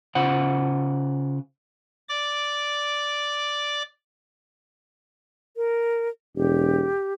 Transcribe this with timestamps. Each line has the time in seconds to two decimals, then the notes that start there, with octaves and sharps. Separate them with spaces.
0.15 C#3 F4 C5 F#5
2.09 D5 D6
5.57 A#4
6.36 E1 G4